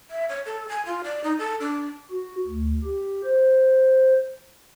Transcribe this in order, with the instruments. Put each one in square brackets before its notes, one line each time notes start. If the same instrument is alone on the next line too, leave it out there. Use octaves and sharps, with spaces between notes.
[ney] E5
C#5
A4
G#5
F4
D5
D#4
A4
D4
[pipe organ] F#4
D2
G4
C5